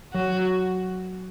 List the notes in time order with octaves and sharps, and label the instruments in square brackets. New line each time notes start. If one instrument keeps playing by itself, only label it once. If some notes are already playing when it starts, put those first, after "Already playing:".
[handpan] F#3 [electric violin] F#4